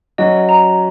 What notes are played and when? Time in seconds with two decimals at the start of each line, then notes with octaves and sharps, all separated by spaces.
0.18 F#3 C#4 F#4 D#5
0.49 A#5